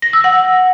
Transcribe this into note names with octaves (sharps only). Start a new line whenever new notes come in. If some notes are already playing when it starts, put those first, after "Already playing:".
A#6
E6
F#5